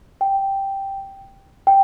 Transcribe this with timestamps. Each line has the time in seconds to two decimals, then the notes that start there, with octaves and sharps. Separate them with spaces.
0.21 G5
1.67 G5